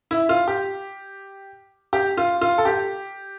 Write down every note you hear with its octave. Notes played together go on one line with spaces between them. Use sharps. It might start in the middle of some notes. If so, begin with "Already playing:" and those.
E4
F4
G4
G4
F4
F4
A4
G4